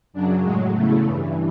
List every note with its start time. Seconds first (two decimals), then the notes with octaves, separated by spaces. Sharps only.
0.13 F#2 C#3 F#3 D4
0.43 A2 G#3
0.47 F#3
0.72 E2 C#3 E3 A3
1.02 G2 E3